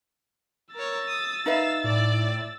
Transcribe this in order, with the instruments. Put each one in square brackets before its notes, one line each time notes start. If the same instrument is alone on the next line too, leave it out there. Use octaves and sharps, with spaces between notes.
[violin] A#4 C#5 [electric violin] E6 A6
[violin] D#6
[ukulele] D#4 B4 E5 [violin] F5 E7
[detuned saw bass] A2 [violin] D5